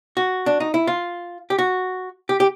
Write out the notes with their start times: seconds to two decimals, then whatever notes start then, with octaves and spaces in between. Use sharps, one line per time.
0.17 F#4
0.46 D4
0.60 D#4
0.74 E4
0.87 F4
1.50 G4
1.58 F#4
2.29 G4
2.40 G4